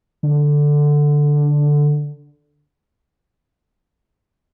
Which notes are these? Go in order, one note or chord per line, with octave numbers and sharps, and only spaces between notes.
D3